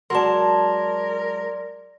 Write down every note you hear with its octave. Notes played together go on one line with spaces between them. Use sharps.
F#3 G#3 A#4 D5 A5 C6